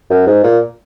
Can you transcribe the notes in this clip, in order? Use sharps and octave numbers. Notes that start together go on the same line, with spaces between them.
F#2
G#2
A#2